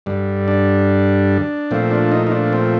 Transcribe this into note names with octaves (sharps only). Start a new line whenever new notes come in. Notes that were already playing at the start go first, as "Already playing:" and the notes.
G2 D3 G3
D4
A#2 F3 A3 C4
D4
D#4
D#4
D4
C4